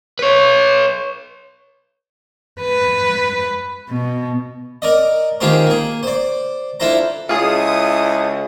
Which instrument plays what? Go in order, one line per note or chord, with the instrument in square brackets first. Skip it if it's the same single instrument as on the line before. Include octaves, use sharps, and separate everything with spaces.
[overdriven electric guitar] B4 C#5
[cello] B4
B2
[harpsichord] A#4 D5 D#5
D#3 F4 G4 G#4 A#4 C5
A#3 G#4
C5 D5
D4 E4 F4 A4 C5 A#5
[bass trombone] C#2 [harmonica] E4 A4 [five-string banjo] F4 G#4 [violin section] D#6